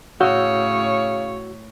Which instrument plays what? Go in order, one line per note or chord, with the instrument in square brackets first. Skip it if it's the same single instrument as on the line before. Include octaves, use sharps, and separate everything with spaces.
[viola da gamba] A2 C#5 [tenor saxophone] C#3 [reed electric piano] F#4 E6 G6